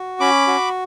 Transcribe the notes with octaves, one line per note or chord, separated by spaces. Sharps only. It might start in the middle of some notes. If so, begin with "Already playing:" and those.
Already playing: F#4
C#4 B5 D6
F#4